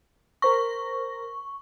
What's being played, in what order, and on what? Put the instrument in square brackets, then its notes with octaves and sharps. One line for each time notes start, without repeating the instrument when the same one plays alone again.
[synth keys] A#4 C5 A#6 [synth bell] C#6